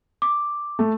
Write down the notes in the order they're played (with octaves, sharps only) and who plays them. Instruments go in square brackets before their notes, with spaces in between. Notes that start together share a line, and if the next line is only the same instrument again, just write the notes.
[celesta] D6
[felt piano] A3